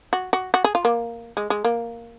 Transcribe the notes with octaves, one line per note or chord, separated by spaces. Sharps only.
F#4
F#4
F#4
G#4
F4
A#3
G#3
G#3
A#3